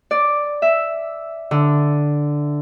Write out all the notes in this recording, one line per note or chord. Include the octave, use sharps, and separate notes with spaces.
D5
E5
D3